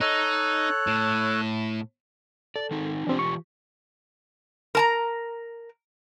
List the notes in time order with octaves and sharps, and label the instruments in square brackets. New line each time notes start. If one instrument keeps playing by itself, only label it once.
[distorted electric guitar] D#4 [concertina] A4 C#5 F#6
[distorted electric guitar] A2
[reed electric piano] A4 [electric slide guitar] D5
[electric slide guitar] D#3 C4 D#4
[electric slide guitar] E3 F4 G4 [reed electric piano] C4 D4
[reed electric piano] C#6
[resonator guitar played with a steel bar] A#4 A5 A#5